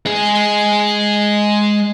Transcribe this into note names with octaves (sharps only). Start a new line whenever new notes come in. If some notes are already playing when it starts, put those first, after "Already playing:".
G#3 G#4